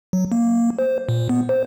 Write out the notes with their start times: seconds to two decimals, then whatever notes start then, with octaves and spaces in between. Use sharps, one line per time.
0.13 F#3
0.32 A#3
0.79 C5
1.09 A#2
1.29 B3
1.49 C5